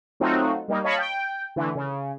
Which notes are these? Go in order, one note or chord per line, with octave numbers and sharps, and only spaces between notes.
F#3 A3 C4 D#4 F4 F#4
G3 A#3 D#4
C#5 D#5 F5 A5 B5 C#6
G5
D3 E3 A3
C#3